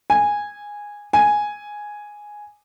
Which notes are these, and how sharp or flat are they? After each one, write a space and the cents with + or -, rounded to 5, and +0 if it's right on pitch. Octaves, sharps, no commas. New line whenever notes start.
G#5 -10
G#5 +0